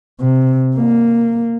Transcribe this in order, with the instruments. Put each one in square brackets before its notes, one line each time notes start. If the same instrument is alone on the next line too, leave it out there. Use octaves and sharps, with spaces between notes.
[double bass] C3
A#3